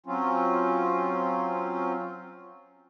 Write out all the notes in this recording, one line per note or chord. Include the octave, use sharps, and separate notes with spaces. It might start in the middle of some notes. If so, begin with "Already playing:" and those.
F#3 C4 C#4 F4